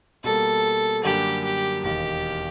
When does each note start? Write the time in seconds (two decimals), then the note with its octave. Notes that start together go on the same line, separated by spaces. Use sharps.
0.24 B2 G3 A#3 A4
1.04 F#2 D3 G3 A#3 D4 G4
1.44 G4
1.84 E1 D#2 D#3 G4